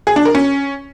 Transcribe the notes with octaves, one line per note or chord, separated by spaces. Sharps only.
G#4
D4
A#4
C#4